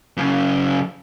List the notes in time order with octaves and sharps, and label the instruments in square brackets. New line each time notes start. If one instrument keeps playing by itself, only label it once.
[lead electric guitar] F#2 C#3